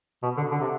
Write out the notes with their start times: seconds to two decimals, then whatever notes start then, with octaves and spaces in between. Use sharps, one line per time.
0.23 B2
0.37 D3
0.51 D3
0.61 C3